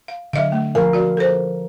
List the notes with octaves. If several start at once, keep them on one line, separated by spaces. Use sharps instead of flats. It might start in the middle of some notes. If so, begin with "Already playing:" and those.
F5
D3 F#3 D#5 F5
A3
F3 A#4 F5 G#5
F#4 D5
A4 C5